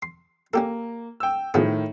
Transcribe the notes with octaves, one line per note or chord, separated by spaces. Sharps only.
C6
A#3 C#4 G4 A4
G5 E6
A2 D#3 F3 B3 G#4